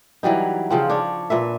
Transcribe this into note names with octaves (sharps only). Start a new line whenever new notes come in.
E3 F#3 G3 D#4
C#3 F3 C4
D4 C#5
A#2 B4 E5